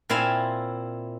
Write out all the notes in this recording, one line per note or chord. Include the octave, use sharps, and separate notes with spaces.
A#2 C4 E4 F5 G#5